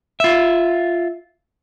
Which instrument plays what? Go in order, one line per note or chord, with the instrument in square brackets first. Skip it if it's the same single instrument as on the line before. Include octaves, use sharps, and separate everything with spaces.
[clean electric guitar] F4 E5